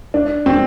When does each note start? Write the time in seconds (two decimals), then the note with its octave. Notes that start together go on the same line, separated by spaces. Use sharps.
0.14 D4
0.46 C4